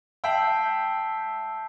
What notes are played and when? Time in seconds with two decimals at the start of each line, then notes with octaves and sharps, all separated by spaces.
0.24 E5 G5 A5 E6 G6 C7 F#7